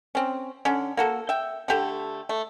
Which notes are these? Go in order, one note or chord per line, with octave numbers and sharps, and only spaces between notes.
C4 C#4
D3 C#4
A#3 F#4 A4
E5 G5
D3 A3 G4 A4
A3